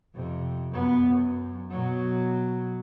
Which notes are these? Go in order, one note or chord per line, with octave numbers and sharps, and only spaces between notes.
F2 C3
F#2 B3
F#2
B2 F#3